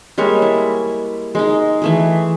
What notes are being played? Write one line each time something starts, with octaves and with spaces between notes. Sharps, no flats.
G3 G#3 A#3 C#5
E4
G#3 D#4
E3 A3 G#4